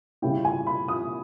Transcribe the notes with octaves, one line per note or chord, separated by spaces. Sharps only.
C#3 G3 C#4 E4 G5
G#5
B5
D#6